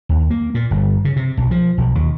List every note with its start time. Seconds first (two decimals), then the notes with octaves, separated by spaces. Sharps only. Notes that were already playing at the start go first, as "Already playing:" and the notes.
0.09 D#2
0.30 A#3
0.55 A#2
0.71 G1
1.05 C#3
1.16 C3
1.37 B1
1.51 F3
1.78 B1
1.95 D#2